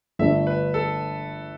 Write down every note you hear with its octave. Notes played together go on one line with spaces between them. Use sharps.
G1 G2 D3 A3 D4 E5
B4
A4